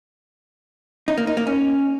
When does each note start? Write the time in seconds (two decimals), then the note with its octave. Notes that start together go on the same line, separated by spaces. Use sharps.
1.08 D#4
1.18 A#3
1.27 D#4
1.37 A#3
1.47 C#4